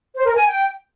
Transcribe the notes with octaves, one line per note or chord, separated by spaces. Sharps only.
C5
A#4
G#5
G5